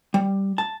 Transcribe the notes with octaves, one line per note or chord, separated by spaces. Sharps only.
G3
A5